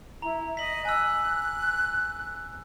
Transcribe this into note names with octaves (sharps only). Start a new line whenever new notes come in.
E4 A#5
D#5 B6 F#7
G#5 E6 F#6